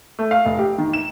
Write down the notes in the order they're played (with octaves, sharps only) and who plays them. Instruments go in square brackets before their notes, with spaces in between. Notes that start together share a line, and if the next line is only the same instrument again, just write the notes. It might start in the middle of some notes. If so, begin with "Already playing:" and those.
[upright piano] A3
F5
F1
G4
D#3
E7